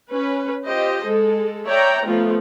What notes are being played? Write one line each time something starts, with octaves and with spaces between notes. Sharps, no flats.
C#4 B4
F4 G4 C5 D#5
G#3 A4
C#5 D5 E5 G5 A#5
F3 A3 B3 F4